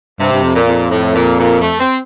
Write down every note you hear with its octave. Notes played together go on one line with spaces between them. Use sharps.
G2 C3
G2
F2
A#2
F2
A2
A#2
A#2
A3
C4